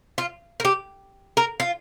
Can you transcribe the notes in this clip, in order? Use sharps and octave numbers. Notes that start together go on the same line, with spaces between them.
F4
A#4
G4
A#4
F4